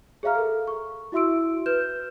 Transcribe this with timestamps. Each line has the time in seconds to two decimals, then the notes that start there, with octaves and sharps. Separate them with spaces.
0.23 G#4 C#5 E5 F5 A#5 F6
0.35 A4 A#4
0.67 C#6
1.12 E4 F#4 E5 C6 E6 D7
1.66 B4 F6 G6 E7